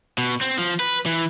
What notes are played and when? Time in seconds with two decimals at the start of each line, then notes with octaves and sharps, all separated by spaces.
0.18 B2
0.41 C4
0.58 F3
0.80 B4
1.06 E3